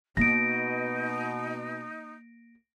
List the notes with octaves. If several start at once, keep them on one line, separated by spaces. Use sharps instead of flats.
B2 A#3 D#4 A#6 D7